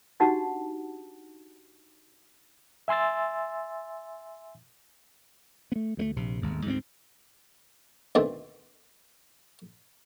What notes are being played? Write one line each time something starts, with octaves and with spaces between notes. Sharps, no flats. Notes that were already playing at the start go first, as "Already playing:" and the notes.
D4 D#4 F#4 G4 F#5 A5
E5 G#5 C6 E6 A6
A3 B3
D2 G3 A3
A#1 C3
G1 D#2 G#2
D2 G#2 A3 C4
D2 B2 D#3 A3 C4